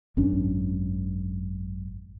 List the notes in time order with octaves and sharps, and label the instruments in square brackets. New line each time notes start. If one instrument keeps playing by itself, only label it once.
[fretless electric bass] G#1 F#2 C#4 D4